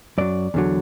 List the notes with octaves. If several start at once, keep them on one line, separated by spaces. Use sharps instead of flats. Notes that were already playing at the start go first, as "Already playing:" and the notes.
F#2 F#3 D5
E2 D3 F#3